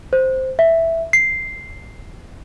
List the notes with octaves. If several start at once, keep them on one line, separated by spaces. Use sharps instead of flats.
C5
E5
C7